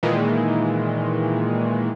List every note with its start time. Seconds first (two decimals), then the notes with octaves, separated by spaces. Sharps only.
0.03 A#2 D#3 E3 G#3